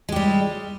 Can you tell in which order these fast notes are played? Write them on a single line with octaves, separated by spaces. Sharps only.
G#3 G4 G3